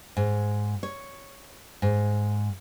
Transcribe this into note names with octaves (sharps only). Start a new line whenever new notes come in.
G#2
C#5
G#2